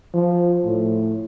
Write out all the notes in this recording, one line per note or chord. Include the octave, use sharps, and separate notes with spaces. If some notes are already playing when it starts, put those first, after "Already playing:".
F3
A2